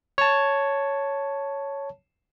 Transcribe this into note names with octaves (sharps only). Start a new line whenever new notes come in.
C#5 A5